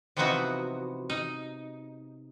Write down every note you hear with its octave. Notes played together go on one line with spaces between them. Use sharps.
C3 E3 F3 B3 D#4 F#4
D#4